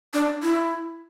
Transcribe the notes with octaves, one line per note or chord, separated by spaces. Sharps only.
D4
E4